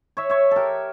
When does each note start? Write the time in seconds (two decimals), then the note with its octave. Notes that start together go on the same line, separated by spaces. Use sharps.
0.17 C#5 E5
0.30 C#5 E5
0.51 G4 A4 A#4